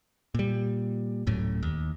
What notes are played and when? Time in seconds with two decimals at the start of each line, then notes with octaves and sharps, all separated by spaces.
0.35 A#2 G3
1.27 D1 F#2 A2
1.63 D#2